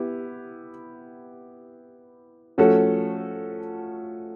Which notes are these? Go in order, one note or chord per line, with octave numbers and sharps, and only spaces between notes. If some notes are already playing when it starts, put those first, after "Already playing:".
Already playing: B3 E4 G4
F3 A3 C#4 F#4 A4